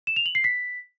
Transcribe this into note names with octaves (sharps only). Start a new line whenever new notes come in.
E7
F7
F#7
C7
B6